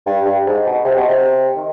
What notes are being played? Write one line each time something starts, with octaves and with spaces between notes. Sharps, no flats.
G2
G2
G#2
B2
C3
B2
C3
D#3